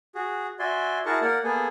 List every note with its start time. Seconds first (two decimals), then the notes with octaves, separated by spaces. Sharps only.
0.15 F#4 G#4
0.59 F#4 D5 E5 G#5 C6
1.06 E4 F#4 G#4 A#4 A5 C#6
1.22 A#3 A#4 D5 F#5
1.44 A#3 B3 G#4 A4 G#5